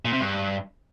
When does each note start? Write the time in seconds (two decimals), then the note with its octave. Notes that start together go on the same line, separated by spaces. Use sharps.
0.05 A#2
0.13 C3
0.21 G2